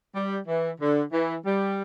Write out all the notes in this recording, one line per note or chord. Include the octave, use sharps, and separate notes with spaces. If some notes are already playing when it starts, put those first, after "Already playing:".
G3
E3
D3
E3
G3